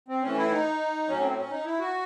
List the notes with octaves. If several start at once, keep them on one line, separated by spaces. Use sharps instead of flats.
C4
A2 E3 C#4
E4
D#4
A2 F#3 C#4
C4
C#4
D#4
E4
F#4